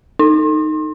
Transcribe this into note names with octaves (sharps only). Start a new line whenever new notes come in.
D#4